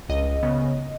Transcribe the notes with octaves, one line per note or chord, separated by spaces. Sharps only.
C#2 D#5
C#3 B3